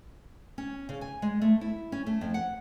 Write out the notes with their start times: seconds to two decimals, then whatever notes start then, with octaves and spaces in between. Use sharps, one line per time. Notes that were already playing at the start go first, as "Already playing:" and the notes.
0.58 C#4
0.89 C#3
1.01 G#5
1.22 G#3
1.42 A3
1.61 E4
1.92 C#4
2.07 A3
2.21 F2
2.34 F#5